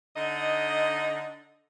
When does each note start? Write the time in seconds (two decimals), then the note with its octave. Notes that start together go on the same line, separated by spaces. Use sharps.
0.14 D3 D#4 D#5